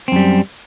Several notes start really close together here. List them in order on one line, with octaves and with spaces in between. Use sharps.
C4 F#2 G3